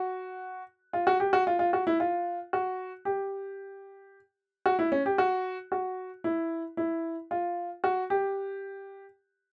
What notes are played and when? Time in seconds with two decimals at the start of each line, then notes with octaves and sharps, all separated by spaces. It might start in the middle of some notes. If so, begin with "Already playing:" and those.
Already playing: F#4
0.93 F4
1.07 F#4
1.20 G4
1.33 F#4
1.47 F4
1.59 F4
1.73 F#4
1.87 E4
2.00 F4
2.53 F#4
3.05 G4
4.66 F#4
4.79 E4
4.92 C#4
5.06 G4
5.18 F#4
5.72 F#4
6.24 E4
6.77 E4
7.31 F4
7.84 F#4
8.10 G4